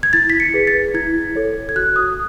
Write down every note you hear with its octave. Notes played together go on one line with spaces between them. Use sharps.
G#6
E4 A6
B6
C#7
G#4 B4
A6
E4 G#6
A4 C#5
G#6
F#4 F#6
D#6